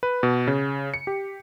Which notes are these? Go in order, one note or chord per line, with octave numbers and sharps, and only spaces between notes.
B4
B2
C#3
C#7
G4